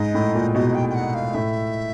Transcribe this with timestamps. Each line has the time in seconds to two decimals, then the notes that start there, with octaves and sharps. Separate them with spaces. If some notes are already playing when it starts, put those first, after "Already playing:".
Already playing: G#2 D#5
0.14 A2
0.35 A#2
0.55 B2 D#5
0.75 G5
0.90 G5
0.95 F#5
1.14 F5
1.34 A2 E5